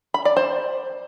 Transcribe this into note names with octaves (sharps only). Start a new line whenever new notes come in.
B5
D5
C5